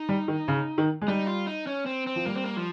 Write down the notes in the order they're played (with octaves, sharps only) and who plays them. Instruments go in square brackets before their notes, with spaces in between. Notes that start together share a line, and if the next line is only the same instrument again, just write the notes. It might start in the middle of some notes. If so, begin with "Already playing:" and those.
Already playing: [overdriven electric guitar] D#4
[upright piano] G3
D#3
C#3
D#3
G#3
[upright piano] G3 [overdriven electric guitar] D#4
[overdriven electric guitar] F4
D#4
C#4
C4
C4
[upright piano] F3
[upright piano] G3 [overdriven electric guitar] A#3
[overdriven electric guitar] C4
A#3
F3